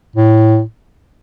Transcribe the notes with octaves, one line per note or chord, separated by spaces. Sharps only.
A2